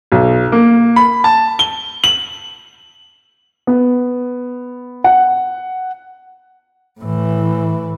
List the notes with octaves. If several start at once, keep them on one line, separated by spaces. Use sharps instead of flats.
B1
A#3
B5
A5
G7
F#7
B3
F#5
A2 E3